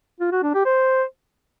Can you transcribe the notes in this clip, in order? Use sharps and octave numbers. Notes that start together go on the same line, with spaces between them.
F4
F#4
D4
G4
C5